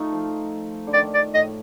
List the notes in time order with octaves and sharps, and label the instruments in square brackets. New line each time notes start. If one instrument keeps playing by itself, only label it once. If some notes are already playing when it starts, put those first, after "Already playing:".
Already playing: [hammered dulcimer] A3 D#4 F4
F3
D3
[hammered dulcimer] D#3 [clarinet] D5
[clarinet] D5
[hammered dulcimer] A2 [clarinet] D#5